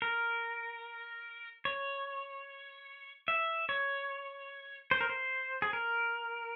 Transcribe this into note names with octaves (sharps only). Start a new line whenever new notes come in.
A#4
C#5
E5
C#5
C5
A#4
C5
G#4
A#4